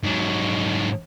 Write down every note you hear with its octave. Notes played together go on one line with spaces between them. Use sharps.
G#2 F#3